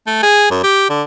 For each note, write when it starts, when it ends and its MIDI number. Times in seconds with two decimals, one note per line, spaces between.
0.07 0.19 57
0.23 0.50 68
0.51 0.60 42
0.63 0.86 67
0.89 1.02 50